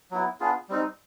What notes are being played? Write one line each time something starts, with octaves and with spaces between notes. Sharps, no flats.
F#3 B3 E4
B3 D4 F4 G#4
G3 C4 D#4